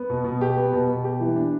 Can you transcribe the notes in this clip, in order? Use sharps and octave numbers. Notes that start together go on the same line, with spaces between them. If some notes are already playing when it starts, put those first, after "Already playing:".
Already playing: B3
B2
B2
G4
B3
B2
B2
G4
E3
D4